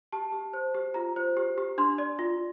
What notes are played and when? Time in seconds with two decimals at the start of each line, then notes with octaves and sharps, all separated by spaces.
0.12 G4 A5
0.32 G4
0.53 C5
0.74 G4
0.94 F4 A#5
1.16 C5
1.37 G4
1.58 G4
1.78 D4 C6
1.98 D5
2.19 F4